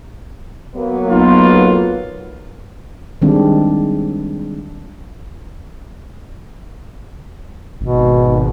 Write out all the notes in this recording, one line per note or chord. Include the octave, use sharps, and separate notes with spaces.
F#3 A#3 B3
B1 F4
D#3 G3 G#3 C4 D4
G#1 B2